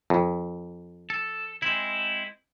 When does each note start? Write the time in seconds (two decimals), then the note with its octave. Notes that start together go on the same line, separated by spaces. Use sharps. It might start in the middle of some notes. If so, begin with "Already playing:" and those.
0.10 F2
1.10 A4
1.62 G#3 C4 E4